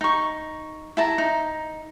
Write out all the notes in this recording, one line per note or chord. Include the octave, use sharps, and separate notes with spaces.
D#4 C#6
E4 A5 A#5
D#4